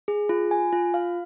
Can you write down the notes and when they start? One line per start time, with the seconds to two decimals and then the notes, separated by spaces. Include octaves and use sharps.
0.08 G#4
0.29 F4
0.51 G#5
0.73 F4
0.94 F5